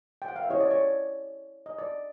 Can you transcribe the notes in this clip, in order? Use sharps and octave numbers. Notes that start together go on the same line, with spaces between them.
G5
F#5
F5
E5
C#4 E4 G4 C5 C#5 D#5
D5
C#5
D5
D#5
D5